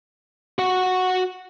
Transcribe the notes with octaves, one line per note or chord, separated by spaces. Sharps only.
F#4 F#5